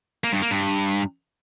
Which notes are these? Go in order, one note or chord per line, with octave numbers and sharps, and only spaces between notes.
A#3
G2
A#3
G2